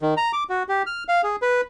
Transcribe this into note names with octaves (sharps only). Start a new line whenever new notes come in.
D#3
A#5
D6
F#4
G4
F6
F5
G#4
B4